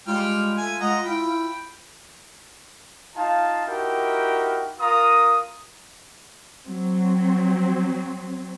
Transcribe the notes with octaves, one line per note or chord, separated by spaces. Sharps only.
G3 G#3 F4 G5 F6
A3 G#5
G#3 D#5 F#5 A#5
E4 G5 B5
D#4 F4 F5 A5
D#4 E4 F#4 G4 A#4 G5
F4 A#4 A#5 D#6
F#3 C4